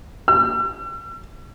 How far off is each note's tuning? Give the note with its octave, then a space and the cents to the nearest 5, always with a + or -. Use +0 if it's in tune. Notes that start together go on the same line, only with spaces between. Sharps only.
E6 +45